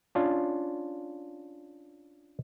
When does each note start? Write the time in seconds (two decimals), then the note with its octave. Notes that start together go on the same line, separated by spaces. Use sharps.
0.15 C#4 D4 F4